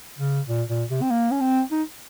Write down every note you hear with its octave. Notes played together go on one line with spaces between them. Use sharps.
C#3
A#2
A#2
C3
C4
A#3
C#4
C4
D#4